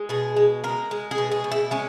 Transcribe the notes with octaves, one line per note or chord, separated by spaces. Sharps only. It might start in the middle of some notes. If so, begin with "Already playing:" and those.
Already playing: G#3
B2 G#4
G#3
G#3 A#4
G#3
G#4
B2
G#4
B2
E4
G#3 C#4